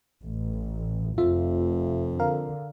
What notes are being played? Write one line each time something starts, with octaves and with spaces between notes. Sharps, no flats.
A1
F1 F2 F4 E5
D3 A#4 F5